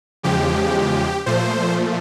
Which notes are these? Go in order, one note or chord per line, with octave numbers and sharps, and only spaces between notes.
E2 C#3 F3 G#3 G4
A#2 F3 A3 C5